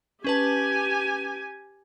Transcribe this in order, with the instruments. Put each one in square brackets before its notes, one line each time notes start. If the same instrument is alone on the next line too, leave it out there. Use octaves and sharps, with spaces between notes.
[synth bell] C#4 B4 A5 [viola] G4 G#5